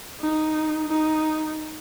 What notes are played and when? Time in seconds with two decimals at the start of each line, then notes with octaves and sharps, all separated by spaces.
0.20 D#4
0.89 D#4